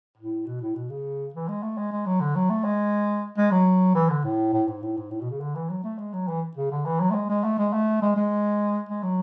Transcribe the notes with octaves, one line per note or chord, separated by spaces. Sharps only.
A2
B2
A2
B2
C#3
E3
G#3
A3
G#3
G#3
F#3
D3
F#3
A3
G#3
G#3
F#3
E3
D3
A2
A2
G#2
A2
G#2
A2
B2
C#3
D3
E3
F#3
A3
G#3
F#3
E3
C#3
D3
E3
F#3
A3
G#3
G#3
A3
G#3
A3
G#3
G#3
G#3
F#3